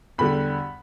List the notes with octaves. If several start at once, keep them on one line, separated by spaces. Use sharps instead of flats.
E2 D3 G3 B5